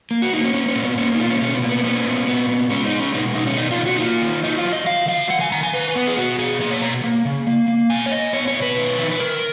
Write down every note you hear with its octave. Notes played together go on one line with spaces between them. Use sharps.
A#3
F#4
A#3 D#4
C#4
A#3 C#4
C#4
A#2
B3
A#3 C#4
D#4
B2 F4
C#4
B2 C#4
B3
A#3
B3
B3 C#4
A#2
A#2 B3
B3
G#3 C#4
D#4
G#3
C#4
B2 D#4
B2 D#4
C#4
D#3 D#4
F4
D#3
F#4
D#4
A#3 F4
D#3
F#3 D#4
F4
F#3
D#5
D#3 F5
F#3 F5
D#3 F#5
G#5
D#3 A#5
G#5
D#3 B4
B3
G#4
B2 F#4
B2 G#4
A#3 G#4
C#5
B2 A#5
A#3
C#3
A#3
A#3
B2 G#5
C#5
B2 D#5
B3 C#5
C#5
B2
B4
D#3
D#3
B4
D#3 A#4